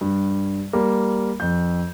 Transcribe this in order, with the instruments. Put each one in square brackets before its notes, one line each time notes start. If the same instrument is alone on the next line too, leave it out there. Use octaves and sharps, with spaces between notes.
[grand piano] G2
G3 A#3
F2 G6